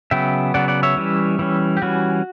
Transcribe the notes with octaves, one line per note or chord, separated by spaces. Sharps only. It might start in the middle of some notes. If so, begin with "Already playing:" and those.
C#3 F#3 B3 E5 G5
C#3 F#3 B3 D5 F#5
D5 F#5
C#5 E5
E3 G3 C#4
E3 G3 C#4
G4
E3 G3 C#4 F#4